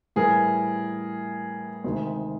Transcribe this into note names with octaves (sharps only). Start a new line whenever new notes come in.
A2 E3 G3 G#4 A#4
D2 C3 D#3 G#3